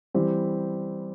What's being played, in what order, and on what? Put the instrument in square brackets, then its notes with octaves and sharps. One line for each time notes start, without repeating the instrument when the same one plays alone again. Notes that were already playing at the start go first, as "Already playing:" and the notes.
[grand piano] E3 G3 C4 G4